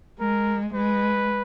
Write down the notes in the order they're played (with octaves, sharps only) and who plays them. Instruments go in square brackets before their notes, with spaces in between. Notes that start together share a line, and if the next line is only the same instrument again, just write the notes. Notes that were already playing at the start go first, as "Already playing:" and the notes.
[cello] G#3 [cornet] A#4
[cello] G#3 [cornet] B4